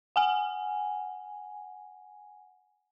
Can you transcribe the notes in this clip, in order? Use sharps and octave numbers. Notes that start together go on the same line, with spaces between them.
F#5 G#5